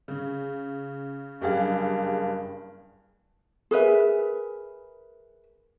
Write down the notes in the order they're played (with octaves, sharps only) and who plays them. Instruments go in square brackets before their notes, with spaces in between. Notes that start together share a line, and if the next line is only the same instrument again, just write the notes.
[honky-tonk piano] C#3
F#1 G2 G4 G#4 F5
[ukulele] G#4 A#4 B4 E5